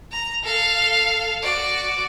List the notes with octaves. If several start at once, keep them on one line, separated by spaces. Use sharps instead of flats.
A#5
A4 F5
F#4 D5